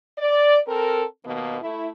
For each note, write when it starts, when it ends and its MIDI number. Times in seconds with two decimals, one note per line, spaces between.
0.19 0.59 74
0.68 1.04 60
0.68 1.04 69
0.68 1.04 70
1.25 1.60 39
1.25 1.60 47
1.25 1.60 51
1.25 1.60 58
1.25 1.60 59
1.61 1.88 57
1.61 1.88 64